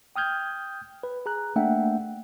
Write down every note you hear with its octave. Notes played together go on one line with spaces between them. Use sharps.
G5 D#6 F6 G6 G#6
B4
G#4 A#5 F#6
A3 A#3 D4 E5 F#5 G5